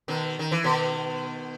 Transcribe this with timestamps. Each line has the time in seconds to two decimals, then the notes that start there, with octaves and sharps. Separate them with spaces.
0.08 B2 D#3
0.39 D#3
0.52 E3
0.64 B2 D#3